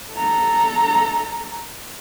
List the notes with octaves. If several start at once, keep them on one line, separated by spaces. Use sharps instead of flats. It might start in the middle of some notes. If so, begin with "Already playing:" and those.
A4 A#5